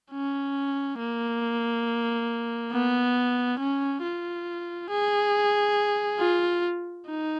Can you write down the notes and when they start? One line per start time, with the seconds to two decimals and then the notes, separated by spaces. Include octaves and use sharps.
0.12 C#4
0.99 A#3
2.72 B3
3.59 C#4
4.03 F4
4.90 G#4
6.19 F4
7.06 D#4